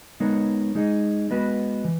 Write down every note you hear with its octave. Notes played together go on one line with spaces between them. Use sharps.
G#3 B3 D#4 A#4 C#5
G#3 D#4 G#4 D#5
G#3 B3 F#4 B4 D#5
E3